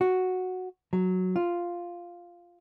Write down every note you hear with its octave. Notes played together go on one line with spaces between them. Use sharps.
F#4
F#3
F4